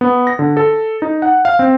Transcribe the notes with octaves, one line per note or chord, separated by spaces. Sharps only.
B3
A#6
D3
A4
D#4
F#5
F5
C4